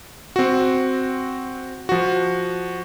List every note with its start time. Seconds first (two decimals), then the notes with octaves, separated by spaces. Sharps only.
0.36 C4 F#4
1.89 F3 F#4